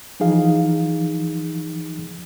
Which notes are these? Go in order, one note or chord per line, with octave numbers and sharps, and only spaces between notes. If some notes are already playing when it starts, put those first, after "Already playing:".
E3 F3 D#4 G#4 F5